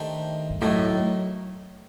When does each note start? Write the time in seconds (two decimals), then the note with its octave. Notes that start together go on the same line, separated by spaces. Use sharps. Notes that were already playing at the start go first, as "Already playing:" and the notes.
Already playing: D#3 A3 D4 G4 C5
0.50 G2
0.61 A2 F#3 A#3 D#4 F#4